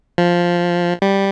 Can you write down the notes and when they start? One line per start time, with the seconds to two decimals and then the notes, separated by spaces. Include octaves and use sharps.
0.18 F3
1.02 G3